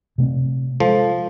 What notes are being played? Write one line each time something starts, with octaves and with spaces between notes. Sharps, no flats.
C3 A3 C4
F3 G#3 A4